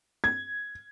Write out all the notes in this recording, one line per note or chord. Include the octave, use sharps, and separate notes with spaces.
G#6